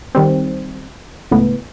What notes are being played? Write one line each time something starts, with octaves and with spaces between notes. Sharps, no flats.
D#3 G3 C4
C#2 A2 B3